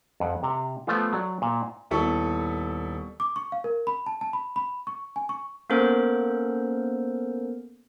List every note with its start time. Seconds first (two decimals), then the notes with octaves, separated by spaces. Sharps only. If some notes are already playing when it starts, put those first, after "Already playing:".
0.20 F2 F#5
0.43 C3 A#5
0.87 F3 A3 B3 F4
1.13 F#3 D5
1.42 A#2
1.91 D#1 B3 E4 A4 C#6
3.20 D6
3.36 C#6
3.52 F5
3.64 A#4
3.87 B5
4.06 A5
4.21 A5
4.33 B5
4.56 B5
4.87 C#6
5.16 G#5
5.29 C#6
5.70 A#3 B3 C#4 A4 A#4 C5